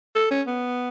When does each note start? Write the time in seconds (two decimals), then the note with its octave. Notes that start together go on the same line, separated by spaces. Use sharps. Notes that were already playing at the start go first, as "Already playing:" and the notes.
0.16 A4
0.31 C#4
0.47 B3